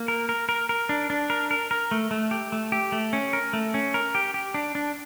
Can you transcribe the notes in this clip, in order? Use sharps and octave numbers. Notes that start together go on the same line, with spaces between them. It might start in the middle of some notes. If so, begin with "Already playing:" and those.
Already playing: A#3
A#4
A#4
A#4
A#4
D4
D4
A#4
A#4
A#4
A3
A3
G4
A3
G4
A3
C#4
A#4
A3
C#4
A#4
G4
G4
D4
D4